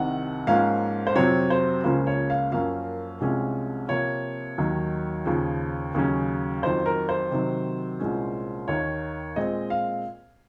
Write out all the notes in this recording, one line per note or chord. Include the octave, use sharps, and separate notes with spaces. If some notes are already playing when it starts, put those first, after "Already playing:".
Already playing: C2 C3 D#3 F#5
G#2 F3 A#3 C#4 F5
C5
F2 C3 F#3 C4 C#5
C5
C#2 C#3 F3 A#3 C#4 C5
C#5
F5
F#2 F3 A#3 C#4 F5
C2 C3 F3 G#3 C#4
C3 F3 A#3 C#5
D#2 D#3 F#3
D#2 C#3 F3
D#2 C#3 F#3 C#4
F2 D#3 F#3 C5
A#4
C5
C3 D#3 F#3
C2 A#2 G#3 C#4
D#2 D#3 A#3 C#5
A#2 G#3 C4 D#5
F5